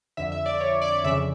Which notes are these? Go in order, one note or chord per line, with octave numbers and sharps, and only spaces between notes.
F2 D3 E5
E5
D5
C#5
D5
F2 C#3 E3 E5